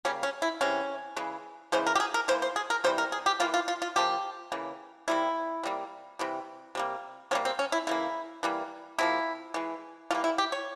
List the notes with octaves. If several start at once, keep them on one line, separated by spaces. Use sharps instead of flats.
C#3 G3 A#3 C#4
C#4
E4
C3 E3 G#3 C#4
C#3 E3 G#3
C#3 E3 G#3 C5
A#4
G4
G#4
A#4
E3 A#3 C5
C5
G#4
A#4
C3 E3 G3 C5
A#4
G#4
G4
E3 A#3 F4
F4
F4
F4
C#3 F3 A#3 G4
C#3 E3 A#3
C3 G3 A#3 E4
C3 G3 A#3
C3 E3 G3
C3 G3 A#3
C3 G3 A#3 C#4
C4
C#4
E4
C#3 E3 A#3 E4
E3 G3 A#3
C3 F3 A#3 E4
E3 G#3
E3 G3 A#3 F4
E4
G4
C#5